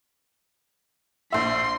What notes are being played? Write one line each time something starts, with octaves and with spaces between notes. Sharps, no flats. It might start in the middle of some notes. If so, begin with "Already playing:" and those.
A#1 E5 C6